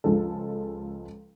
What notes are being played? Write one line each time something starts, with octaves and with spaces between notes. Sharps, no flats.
C#2 F3 G#3 A4